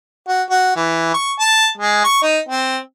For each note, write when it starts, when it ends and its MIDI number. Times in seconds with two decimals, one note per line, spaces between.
0.28 0.43 66
0.50 0.73 66
0.76 1.14 52
1.14 1.33 85
1.40 1.67 81
1.78 2.02 56
2.04 2.19 85
2.22 2.39 63
2.49 2.78 60